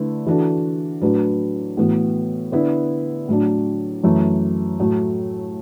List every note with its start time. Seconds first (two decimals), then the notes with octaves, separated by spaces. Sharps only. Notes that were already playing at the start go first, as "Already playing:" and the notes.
Already playing: D3 A3 E4 B4
0.26 E3 D4 F#4 A4
1.01 A2 F#3 D4 B4
1.77 A2 E3 B3 F#4
2.52 D3 B3 E4 B4
3.28 A2 F#3 D4
4.04 F#2 E3 A3
4.80 A2 F#3 A3